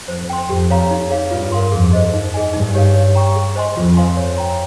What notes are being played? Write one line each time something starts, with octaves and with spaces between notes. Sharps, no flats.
F2 C5
G5 C6
F2 G4
C#5 F5 A#5
D#4
G#4 C#5 F5
G2 F4
A#4 F5 C6
F2 G#4
C5 D#5
D#4
G#4 D#5 G#5
G2 D#4
G4 C#5 F5
C#5
G5 A#5 C#6
G#4
C5 D#5 G#5 C6
F2 F4
C5 F5 G#5 C6
C#5
G5 A#5